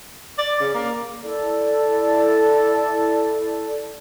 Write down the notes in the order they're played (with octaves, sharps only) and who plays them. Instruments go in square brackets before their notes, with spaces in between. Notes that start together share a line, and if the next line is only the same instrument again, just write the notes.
[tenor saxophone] D5
C#3
A#3
[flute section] E4 A4 D5